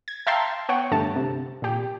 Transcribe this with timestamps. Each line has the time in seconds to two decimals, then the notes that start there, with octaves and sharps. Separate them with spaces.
0.08 G#6
0.27 E5 F5 G5 A5 A#5 C6
0.69 B3 C#5 F#5 G5
0.91 G2 D3 A3 A5
1.16 C3
1.62 A#2 G4